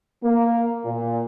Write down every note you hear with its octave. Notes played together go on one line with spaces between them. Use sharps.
A#3
A#2